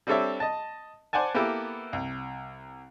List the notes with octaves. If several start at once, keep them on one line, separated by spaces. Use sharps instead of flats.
G3 C4 D4 A4 C#5 E5
D#5 A5
C5 D5 F#5 G#5 A5
A#3 B3 E4 G4 A4 B4
C2